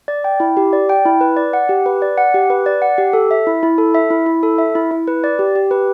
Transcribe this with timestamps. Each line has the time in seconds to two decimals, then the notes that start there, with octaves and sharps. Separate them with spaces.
0.08 D5
0.24 G5
0.40 E4
0.57 G4
0.73 D5
0.89 G5
1.06 E4
1.21 B4
1.37 D5
1.53 F#5
1.69 G4
1.86 B4
2.02 D5
2.18 F#5
2.34 G4
2.50 B4
2.66 D5
2.82 F#5
2.98 G4
3.13 A4
3.31 E5
3.47 E4
3.63 E4
3.78 A4
3.95 E5
4.10 E4
4.26 E4
4.43 A4
4.58 E5
4.75 E4
4.91 E4
5.08 B4
5.24 D5
5.39 G4
5.55 G4
5.71 B4